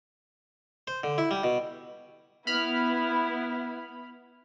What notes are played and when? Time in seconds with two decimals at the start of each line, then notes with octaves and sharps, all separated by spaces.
0.87 C5
1.03 D3
1.18 E4
1.31 G3
1.44 B2
2.47 B3 E4 B5 F6